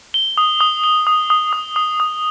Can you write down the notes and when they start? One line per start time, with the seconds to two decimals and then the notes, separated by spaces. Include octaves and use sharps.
0.14 G7
0.37 D#6
0.61 D#6
0.84 G7
1.07 D#6
1.30 D#6
1.53 D#6
1.76 D#6
2.00 D#6